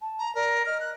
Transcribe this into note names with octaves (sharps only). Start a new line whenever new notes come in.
A5
A#5
A#4 D5
D#5 F6
F#6